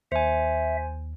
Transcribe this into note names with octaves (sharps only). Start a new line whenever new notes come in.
D#2 C5 E5 G#5